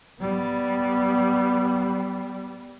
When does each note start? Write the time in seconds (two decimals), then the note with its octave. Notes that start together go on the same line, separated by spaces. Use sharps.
0.20 G3 B3